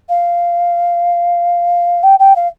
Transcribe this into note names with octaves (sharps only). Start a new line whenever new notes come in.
F5
G5
G5
F5